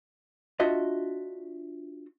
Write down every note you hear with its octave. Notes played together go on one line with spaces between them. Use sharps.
D4 F4 F#4 D#5 E5